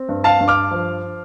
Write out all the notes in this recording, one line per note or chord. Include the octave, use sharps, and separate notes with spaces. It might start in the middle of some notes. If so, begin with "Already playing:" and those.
Already playing: C4
G2
F5 A5
G2
D6 F6
F3